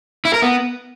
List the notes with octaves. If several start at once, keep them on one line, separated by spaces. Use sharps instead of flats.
E4
A#4
B3